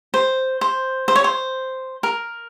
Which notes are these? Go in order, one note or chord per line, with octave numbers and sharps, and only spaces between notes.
C5
C5
C5
C#5
C5
A#4